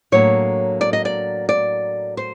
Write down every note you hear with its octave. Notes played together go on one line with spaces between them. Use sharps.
A2 F#3 A#3 D4 C#5
D5
D#5
D5
D5
C5